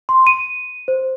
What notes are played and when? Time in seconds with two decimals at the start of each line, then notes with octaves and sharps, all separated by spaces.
0.09 C6
0.27 D#7
0.88 C5